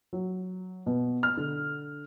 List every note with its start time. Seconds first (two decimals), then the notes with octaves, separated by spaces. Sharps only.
0.13 F#3
0.86 B2
1.23 F6
1.37 D3